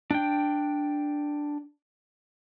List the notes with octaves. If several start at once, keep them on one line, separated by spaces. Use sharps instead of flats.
D4 G5